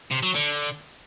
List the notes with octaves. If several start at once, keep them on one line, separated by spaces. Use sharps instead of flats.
C3
F#3
D3